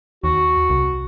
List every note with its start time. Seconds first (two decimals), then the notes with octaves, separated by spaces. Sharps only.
0.24 D#2 F#4
0.70 C2